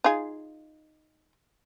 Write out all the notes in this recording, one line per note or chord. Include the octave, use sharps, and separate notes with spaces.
D#4 F4 G#4